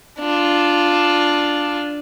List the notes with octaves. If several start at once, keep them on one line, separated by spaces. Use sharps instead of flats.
D4 F4